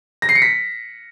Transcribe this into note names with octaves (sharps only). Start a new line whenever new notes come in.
A#6
C7
C#7
B6